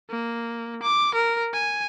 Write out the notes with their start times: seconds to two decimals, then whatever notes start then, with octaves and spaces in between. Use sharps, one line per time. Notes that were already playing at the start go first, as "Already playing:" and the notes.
0.10 A#3
0.83 D6
1.14 A#4
1.53 G#5